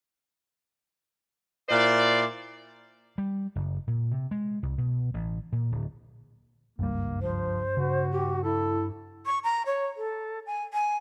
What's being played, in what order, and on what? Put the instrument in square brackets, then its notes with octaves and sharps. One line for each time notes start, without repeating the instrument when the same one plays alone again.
[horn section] A#2 E4 C5 D5
[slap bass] G3
F#1
A#2
C3
G#3
C2
B2
A1
A#2
D1
[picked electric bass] F#1 C#2 G3 [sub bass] G2 [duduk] A#3
[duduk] F3 [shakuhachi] C5
[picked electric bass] C#3 [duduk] F#4
[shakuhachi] G4
[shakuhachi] E4 [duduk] A4
[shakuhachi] C#6
A#5
C#5
A4
G#5
G#5